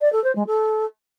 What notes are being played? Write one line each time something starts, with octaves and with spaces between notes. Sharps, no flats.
D5
A4
C5
G#3
A4